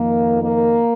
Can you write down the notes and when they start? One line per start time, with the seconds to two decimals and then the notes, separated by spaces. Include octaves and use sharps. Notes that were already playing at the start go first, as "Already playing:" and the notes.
Already playing: F2 D#3 A#3
0.43 A#3